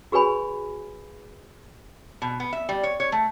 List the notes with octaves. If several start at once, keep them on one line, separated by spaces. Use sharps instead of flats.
F#4 G#4 B4 C#5 G#5 B5
B2
B3
E5
G3
C#5
C#5
A3